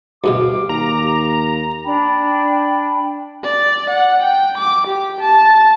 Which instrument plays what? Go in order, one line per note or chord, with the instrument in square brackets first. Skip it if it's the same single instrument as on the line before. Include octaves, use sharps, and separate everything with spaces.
[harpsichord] D2 G2 B2 [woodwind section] G4 F5 D6
[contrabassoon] D#2 [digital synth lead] A#5
[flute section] D4 G5 B5
[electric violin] D5
F#5
G5
D6
G4
A5